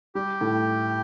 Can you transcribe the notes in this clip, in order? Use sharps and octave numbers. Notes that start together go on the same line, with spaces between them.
G3 G4
A2